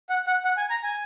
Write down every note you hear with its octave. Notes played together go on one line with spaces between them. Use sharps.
F#5
F#5
F#5
G#5
A#5
G#5